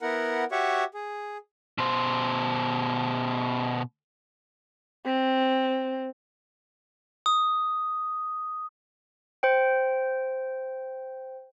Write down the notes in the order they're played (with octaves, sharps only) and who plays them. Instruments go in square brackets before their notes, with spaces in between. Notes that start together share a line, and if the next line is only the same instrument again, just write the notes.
[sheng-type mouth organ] B3 E4 A#4 F#5
F#4 G4 C#5 E5 F#5 C#6
G#4
[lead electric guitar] B2 C5
[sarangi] C4
[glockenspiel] D#6
[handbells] C5 G5